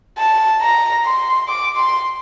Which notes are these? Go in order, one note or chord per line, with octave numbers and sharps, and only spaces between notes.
A5
A#5
C6
D6
C6